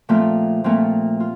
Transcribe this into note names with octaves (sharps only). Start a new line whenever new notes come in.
A#2 F3 A3 C4 F4
A#2 F3 A3 C4 F4
F4